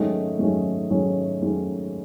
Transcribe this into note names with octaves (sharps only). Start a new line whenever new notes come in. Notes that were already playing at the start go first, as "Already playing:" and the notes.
Already playing: G#2 D#3 F#3 A3 C#4 D#5
G#2 D#3 F#3 A3 C#4 C#5
G#2 D#3 F#3 A3 C#4
G#2 D#3 F#3 A3 C#4